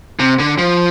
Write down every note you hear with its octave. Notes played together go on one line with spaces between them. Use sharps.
C3
D3
F3